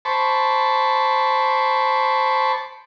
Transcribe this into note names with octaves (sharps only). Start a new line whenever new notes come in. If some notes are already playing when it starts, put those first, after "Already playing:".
C5 A5 B5 C#6 D6